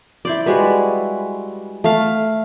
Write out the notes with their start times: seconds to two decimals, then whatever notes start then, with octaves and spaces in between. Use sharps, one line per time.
0.25 E4 C5 D5
0.46 G3 G#3 F#4 B4
1.84 A3 F5